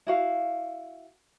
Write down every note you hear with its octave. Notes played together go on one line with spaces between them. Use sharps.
E4 F#4 F5